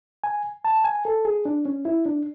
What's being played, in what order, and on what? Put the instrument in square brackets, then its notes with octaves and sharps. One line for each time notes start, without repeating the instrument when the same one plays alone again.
[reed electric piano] G#5
A5
G#5
A4
G#4
D4
C#4
E4
D4